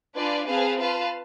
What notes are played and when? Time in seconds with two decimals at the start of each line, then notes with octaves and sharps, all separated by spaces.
0.15 D4 F4 B4 D5 G#5
0.46 C4 G#4 B4 F5 A5
0.77 F4 B4 F5 A5